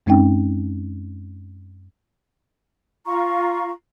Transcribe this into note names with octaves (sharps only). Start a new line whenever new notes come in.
F#2 G#3 C4 C#4 D#4 G5
F4 A#5 C#6